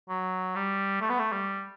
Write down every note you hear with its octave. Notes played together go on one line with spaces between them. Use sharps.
F#3
G3
A3
B3
A3
G3